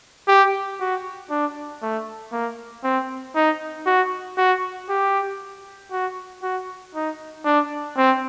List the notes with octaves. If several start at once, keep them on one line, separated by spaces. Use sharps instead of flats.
G4
F#4
D4
A3
A#3
C4
D#4
F#4
F#4
G4
F#4
F#4
D#4
D4
C4